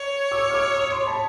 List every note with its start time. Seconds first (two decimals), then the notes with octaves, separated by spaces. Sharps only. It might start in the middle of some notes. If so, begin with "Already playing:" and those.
Already playing: C#5
0.32 D6 E6
0.50 F6
0.54 D6 E6
0.76 C#6 D#6
0.92 C6 D6
1.07 A5 B5